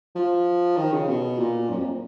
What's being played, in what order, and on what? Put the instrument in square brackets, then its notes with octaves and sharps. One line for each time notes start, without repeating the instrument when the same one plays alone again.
[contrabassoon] F3
D#3
C#3
B2
A#2
F#2
F2